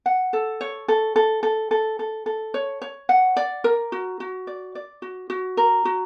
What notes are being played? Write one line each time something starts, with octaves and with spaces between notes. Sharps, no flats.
F#5
A4
C#5
A4
A4
A4
A4
A4
A4
C#5
C#5
F#5
D5
A#4
F#4
F#4
D5
D5
F#4
F#4
A#4
F#4